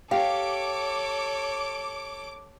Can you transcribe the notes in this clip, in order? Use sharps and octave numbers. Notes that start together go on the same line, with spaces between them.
G4 A4 C#5 F5 D6